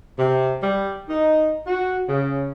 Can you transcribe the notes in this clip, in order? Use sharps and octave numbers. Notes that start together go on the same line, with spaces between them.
C3
G3
D#4
F#4
C#3